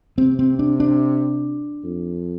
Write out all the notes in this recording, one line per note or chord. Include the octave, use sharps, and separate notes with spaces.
C3 C4
C4
D4
D4
F2